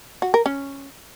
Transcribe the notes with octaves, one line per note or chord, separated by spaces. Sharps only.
F#4
A#4
C#4